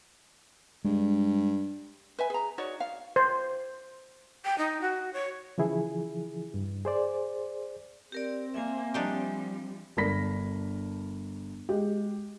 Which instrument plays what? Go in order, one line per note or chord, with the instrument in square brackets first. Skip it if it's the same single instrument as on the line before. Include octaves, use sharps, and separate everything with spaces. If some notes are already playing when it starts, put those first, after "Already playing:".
[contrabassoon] G2 [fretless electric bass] G#3
[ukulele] B4 E5 G#5
G#4 A#5
D#4 F#4 C#5 D5
F5
[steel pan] C5
[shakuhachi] G5
D#4
F#4
C#5
[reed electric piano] C#3 E3 F3 E4 G#4
G2
G#4 C5 D5
[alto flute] C4 [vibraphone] G4 A#4 D5
[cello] A#3 [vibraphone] E5 G#5
[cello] F3 G3 [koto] D4 D#4 G4
[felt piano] G1 D4 A#4 B5 A#6 B6
G#3 G4